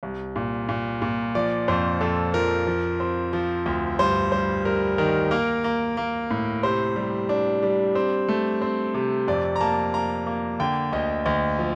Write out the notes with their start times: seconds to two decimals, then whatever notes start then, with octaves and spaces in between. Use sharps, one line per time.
0.03 C2
0.36 A#2
0.69 A#2
1.02 A#2
1.35 F3 D5
1.68 F2 C5
2.01 F2 A4
2.34 F3 A#4
2.67 F3
3.00 C4
3.33 F3
3.66 D2
3.99 G2 C5
4.32 G3 C5
4.65 G3 A#4
4.98 D#3 A#4
5.31 A#3 A#4
5.64 A#3
5.97 A#3
6.31 A2
6.63 C3 C5
6.96 G3
7.29 D4
7.63 G3
7.95 C4
8.28 A3
8.62 C4
8.94 C3
9.28 F2 D5
9.56 A#5
9.61 A#3 A5
9.94 A#3 A#5
10.27 A#3
10.60 D3 G5
10.92 D2 D#5
11.26 D2 D#5
11.59 F3